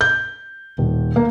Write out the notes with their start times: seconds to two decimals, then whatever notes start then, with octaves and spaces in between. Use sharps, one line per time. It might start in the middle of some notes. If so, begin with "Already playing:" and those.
0.01 G6
0.78 D#1
1.16 A#3